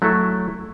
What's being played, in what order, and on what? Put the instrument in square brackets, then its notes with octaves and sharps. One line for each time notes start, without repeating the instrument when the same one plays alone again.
[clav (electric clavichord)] F#3 A3 E4 A4